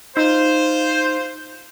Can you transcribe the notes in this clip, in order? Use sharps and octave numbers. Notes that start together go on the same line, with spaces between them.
D#4 F4 C5